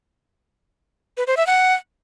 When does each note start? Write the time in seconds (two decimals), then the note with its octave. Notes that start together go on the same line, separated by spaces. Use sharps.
1.17 B4
1.27 C5
1.37 E5
1.47 F#5